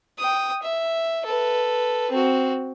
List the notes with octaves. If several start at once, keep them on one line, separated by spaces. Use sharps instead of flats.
G5 D#6
E5
A4 B4
C4 F#4